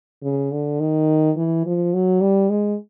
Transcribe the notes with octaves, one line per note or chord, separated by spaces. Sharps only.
C#3
D3
D#3
E3
F3
F#3
G3
G#3